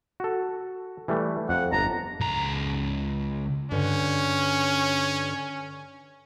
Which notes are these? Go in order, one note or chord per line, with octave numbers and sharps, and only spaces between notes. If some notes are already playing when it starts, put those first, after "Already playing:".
F#4 A4
E3 G3 A3
F2 F#5
G1 A5 A#5
C#2 A#5
G2 D3 C#4